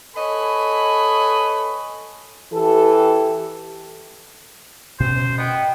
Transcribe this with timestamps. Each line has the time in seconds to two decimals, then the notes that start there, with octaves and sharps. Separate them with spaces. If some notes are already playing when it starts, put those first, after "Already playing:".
0.16 A4 B4 C#5 D#5 G#5 B5
2.52 E3 G4 A4
5.00 B2 C#4 C5
5.38 B3 D#5 G5